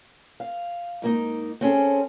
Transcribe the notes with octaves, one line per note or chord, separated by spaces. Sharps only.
F5
G#2 A#3 D#4
C4 C#4 G#4 A4